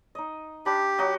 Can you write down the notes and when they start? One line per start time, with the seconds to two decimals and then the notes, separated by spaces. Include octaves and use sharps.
0.15 D#4 D#5
0.66 D4 G4 B5
0.98 F#3 F#4 D#5